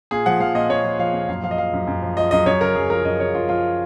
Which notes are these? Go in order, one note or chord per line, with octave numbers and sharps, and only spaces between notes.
A#2 G#4
F3 F#5
F3 F5
A#2 D#5
A#2 C#5
F3
F3 F5
A#2
F#2 F5
F3 F5
D#5
F3 F5
F#2
F#2
F3
F3 D#5
F#2 D#5
F#2 C#5
C#3 A#4
F#2 G#4
F3 A#4
F#2 D#5
C#3 C#5
F#2 F4
F3 F4